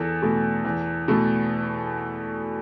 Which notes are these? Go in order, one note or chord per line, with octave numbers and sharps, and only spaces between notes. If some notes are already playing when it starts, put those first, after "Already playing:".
Already playing: E2 A4
B2 A3
E2
B2 A3